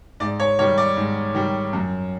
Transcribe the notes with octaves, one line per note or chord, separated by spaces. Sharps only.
G#2 D5
C#5
D#3 G3 C#5
D5
G#2
D#3 G3
F#2